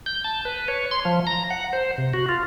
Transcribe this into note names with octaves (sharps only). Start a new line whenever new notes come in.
G6
A5
B4
C#5
C6
F3
A#5
F#5
C5
C3
F#4
F4